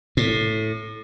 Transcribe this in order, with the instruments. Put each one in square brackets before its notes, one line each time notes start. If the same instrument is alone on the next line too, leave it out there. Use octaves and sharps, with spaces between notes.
[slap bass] A2